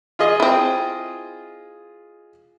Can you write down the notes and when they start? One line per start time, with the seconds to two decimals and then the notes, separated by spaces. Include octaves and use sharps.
0.19 F4 G#4 D#5
0.40 C4 E4